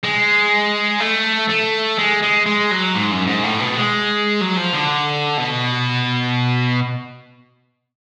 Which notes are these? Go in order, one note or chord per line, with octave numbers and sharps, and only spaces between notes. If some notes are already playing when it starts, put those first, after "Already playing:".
G#3
A3
A3
G#3
G#3
G#3
F#3
G#2
F#2
G#2
A2
B2
G#3
F#3
F3
D3
B2